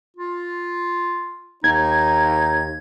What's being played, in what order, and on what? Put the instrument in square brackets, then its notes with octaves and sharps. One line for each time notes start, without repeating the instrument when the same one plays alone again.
[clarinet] F4
[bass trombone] D#2 [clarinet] D#4 [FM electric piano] G#6